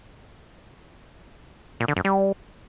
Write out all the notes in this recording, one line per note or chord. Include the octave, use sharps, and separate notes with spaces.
A#2
D3
F#2
G3